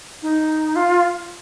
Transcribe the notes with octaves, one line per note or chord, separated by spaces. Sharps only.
D#4
F4